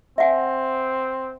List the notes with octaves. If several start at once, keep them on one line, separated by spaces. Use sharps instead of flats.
C4 E5 F#5 G#5